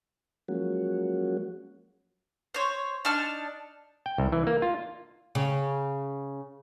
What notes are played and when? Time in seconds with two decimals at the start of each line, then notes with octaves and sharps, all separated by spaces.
0.48 F3 F#3 G#3 A#3 C#4 F#4
2.54 C5 C#5
3.05 D4 D#4 A5 F6
4.06 G5
4.18 C2
4.32 E3
4.47 A#3
4.62 F4
5.35 C#3